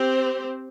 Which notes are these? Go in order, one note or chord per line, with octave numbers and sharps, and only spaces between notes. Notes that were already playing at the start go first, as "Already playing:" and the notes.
Already playing: C4 G4 C5